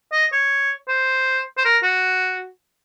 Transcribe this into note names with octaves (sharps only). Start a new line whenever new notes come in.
D#5
C#5
C5
C5
A#4
F#4